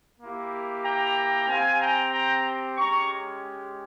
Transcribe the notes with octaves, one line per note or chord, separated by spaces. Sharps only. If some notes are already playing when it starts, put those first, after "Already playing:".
A#3 E4 G4
G5 A#5
C4 G4 F5 G#5
G5 A#5
G5 A#5
G#3 C#4 G4 A#5 C#6